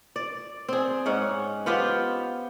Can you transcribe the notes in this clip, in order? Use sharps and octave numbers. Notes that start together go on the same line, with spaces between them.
D5
C4 G#4
G#2 C#4 F#5
B3 F4 G4 C5